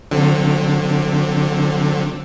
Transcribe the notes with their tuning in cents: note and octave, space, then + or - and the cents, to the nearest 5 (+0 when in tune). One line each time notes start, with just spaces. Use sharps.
D3 +0 F#3 -35 C4 +0